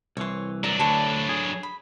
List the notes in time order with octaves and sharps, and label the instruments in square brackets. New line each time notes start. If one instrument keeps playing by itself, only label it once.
[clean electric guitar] C2 E3 [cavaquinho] C#5 C6
[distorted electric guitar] F#3 D4 [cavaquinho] A#4
[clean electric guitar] D2 [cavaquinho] A4 B4 C#5
[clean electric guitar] G#4
[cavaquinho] B5